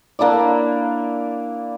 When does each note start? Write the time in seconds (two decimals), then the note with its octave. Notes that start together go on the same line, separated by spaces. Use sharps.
0.19 A#3 D4 E4 D5